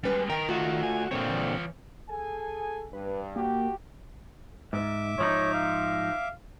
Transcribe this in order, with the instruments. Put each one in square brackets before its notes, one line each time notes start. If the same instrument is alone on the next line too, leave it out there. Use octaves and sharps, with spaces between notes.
[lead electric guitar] G3 G#3 [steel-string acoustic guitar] C#4 B4
[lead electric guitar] D#3 [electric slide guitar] A#4 [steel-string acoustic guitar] G5
[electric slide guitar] A3 F#4 [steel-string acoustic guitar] F4
[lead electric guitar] G#5
[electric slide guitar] A#2 D3 C4 [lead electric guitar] F4 C#5
[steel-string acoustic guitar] E3
[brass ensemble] G#4 A4 G#5
[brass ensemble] G2 [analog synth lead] B4
[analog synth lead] A#3 [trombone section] F#4 G4
[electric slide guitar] G#2 [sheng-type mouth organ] E5 D6
[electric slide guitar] G#2 F3 D#4 [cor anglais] C#5
[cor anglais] F5